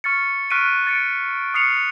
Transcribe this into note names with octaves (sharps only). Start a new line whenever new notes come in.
C#6 F6 A6 C#7
C#6 F6 F#6 B6 D7 D#7
A6 C#7 D7
D#6 F6 C7 C#7 F7